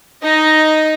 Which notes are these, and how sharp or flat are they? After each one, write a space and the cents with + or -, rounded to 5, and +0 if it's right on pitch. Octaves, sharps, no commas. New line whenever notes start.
D#4 +0 D#5 +0